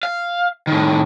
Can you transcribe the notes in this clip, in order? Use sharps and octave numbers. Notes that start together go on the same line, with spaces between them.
F5
A2 D#3